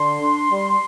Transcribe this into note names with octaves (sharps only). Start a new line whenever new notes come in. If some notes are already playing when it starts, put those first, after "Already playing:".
Already playing: D3 C6
D4
G3